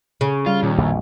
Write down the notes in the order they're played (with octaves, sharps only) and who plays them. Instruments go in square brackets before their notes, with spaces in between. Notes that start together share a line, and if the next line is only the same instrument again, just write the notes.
[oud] C#3
[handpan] G3 [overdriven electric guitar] F4
[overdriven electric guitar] D#2 [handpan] A#2
[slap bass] A#1 F2 B2